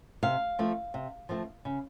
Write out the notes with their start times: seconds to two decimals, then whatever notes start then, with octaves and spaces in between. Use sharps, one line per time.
0.23 C3 F5
0.59 F3 A3 C4
0.94 C3
1.29 F3 A3 C4
1.65 C#3